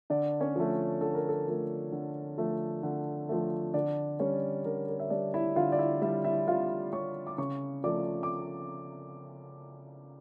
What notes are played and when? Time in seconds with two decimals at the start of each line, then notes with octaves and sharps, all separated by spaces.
0.10 D3 D4 D5
0.40 C#4 C#5
0.56 F3 A3
1.01 D3 A4
1.15 A#4
1.29 A4
1.47 F3 A3 A#4
1.92 D3
2.38 F3 A3
2.83 D3
3.29 F3 A3
3.74 D3 D4 D5
4.20 G3 C#4 C#5
4.65 D3 A#4
4.88 A#4
4.99 E5
5.10 G3 D4 D5
5.34 E4 E5
5.56 D3 F4 F5
5.72 D5
5.78 E4 E5
6.02 G3 E4 E5
6.24 E4 E5
6.47 D3 F4 F5
6.93 G3 C#5 C#6
7.27 D6
7.38 C#3 C#5 C#6
7.84 F3 A3 D5 D6
8.23 D6